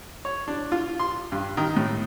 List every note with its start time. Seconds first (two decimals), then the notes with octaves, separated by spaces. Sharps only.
0.25 C#5
0.48 D4
0.72 F4
0.99 C6
1.32 G2
1.57 D#3
1.76 A2